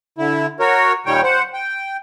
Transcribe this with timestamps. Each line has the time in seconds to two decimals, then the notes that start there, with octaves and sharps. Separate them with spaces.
0.18 D3 E4
0.60 F#4 A#4 C#5
1.06 A#2 D#3 G3 C#5 G5
1.23 C5 F#5
1.54 G5